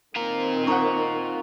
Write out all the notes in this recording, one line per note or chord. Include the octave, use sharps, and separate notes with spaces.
D#3 C4 F4 A#4
D#4 F#5 A#5 C#6